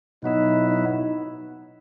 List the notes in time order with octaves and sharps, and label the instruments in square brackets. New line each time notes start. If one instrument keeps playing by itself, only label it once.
[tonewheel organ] B2 F#3 B3 E4 [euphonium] D#4
[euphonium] D#4